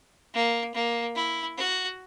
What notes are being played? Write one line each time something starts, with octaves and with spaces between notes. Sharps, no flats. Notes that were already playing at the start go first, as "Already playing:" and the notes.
A#3
A#3
E4
F#4